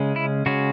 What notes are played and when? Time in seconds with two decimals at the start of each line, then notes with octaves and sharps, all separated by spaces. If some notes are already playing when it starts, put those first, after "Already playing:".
Already playing: C#3 G#3 C#4
0.16 E4
0.46 C#3 G#3 C#4 F#4